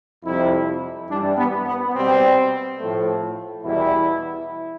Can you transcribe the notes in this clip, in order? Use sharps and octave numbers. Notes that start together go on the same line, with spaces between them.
F2 C3 G3 E4
G2 E3 G3 D4
B3
B3
B2 G3 C4
A2 F3 A3
E2 B2 G3 E4